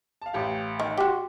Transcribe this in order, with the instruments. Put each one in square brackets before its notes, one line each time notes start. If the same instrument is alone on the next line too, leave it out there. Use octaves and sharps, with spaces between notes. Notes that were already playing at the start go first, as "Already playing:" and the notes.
[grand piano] F5 A5
A1 G4 F5
[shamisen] D#3
[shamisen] F#4 G4 [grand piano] C6 C#6